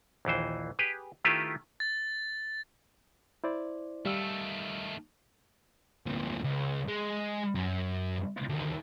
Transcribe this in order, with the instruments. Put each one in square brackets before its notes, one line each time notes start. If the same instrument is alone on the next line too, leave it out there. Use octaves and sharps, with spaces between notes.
[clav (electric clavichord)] A#1 D#2 E3 C5
G4 G#4 B4
D#3 A3 E4 F4 G4 B4
[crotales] A6
[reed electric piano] E4 C5 D5
[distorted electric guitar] D#3 A3 [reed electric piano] G3 F5 E6
[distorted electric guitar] D2 A#2
C#2
G#3
F#2
D2 D#3